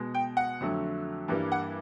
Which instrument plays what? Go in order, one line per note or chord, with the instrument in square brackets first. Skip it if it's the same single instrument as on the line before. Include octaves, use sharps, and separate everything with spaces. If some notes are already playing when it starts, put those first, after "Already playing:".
Already playing: [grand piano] B2 G#3
G5
F#5
F2 D3 F#3 A3
G2 E3 G3 A#3
F#5